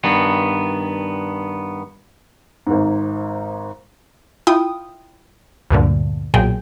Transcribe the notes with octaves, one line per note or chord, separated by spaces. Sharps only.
G2 D#3 B3
G#1 G#2
E4 F4 G5 D#6
D2 G2 A#2 D3
B1 A#2 F#3 G#4 G5